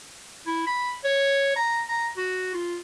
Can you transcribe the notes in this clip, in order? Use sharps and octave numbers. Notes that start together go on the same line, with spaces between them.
E4
B5
C#5
A#5
A#5
F#4
F4